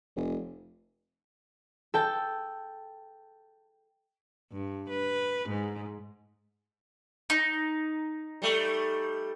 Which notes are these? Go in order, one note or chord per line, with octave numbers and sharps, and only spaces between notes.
F1
A4 G5 A5
G2
B4
G#2
D#4
G3 A3